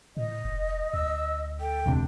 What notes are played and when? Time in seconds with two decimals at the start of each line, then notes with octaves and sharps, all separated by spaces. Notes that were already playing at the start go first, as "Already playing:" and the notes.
0.17 A2 D#5
0.45 F1
0.94 D2 E6
1.60 A4 G5
1.86 E1 C#2 C3 D4